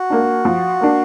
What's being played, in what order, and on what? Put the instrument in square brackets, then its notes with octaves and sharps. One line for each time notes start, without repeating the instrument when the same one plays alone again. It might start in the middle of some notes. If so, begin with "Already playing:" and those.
Already playing: [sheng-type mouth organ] F#4
[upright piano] A#3 D4
F3
A#3 D4